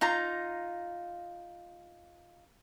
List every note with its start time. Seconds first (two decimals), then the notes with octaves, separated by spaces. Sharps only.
0.01 D#4 F4 A#5